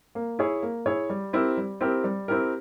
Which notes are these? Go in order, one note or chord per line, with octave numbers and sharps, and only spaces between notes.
A#3
E4 G#4 C#5
A#3
E4 G#4 C#5
G3
C4 E4 G4 A#4
G3
C4 E4 G4 A#4
G3
C4 E4 G4 A#4